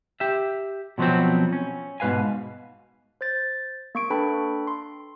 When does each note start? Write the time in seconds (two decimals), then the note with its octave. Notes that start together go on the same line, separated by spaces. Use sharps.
0.20 G4 E5
0.98 B2 F3 F#3 B3 C4
1.53 C#4
2.00 G#2 B2 B4 F5 G#5
3.21 C5 G6 A6
3.95 A#3 C#6 D7
4.10 D4 A4 B4 G5 A5 B5
4.67 C6